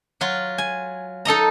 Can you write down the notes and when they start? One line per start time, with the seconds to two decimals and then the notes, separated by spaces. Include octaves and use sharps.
0.21 F#3 F4
0.58 G#5
1.25 D#4 A4 D#5 A#5